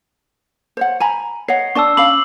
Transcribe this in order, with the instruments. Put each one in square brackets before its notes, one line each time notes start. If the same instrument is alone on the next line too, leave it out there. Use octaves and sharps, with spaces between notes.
[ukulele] C5 C#5 F#5
G#5 A#5 B5
[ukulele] C#5 D#5 F#5 [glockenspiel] C7
[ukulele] D4 D5 A5 [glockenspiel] C#6 E6
[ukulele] C#4 F5 [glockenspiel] B5 D6 F#7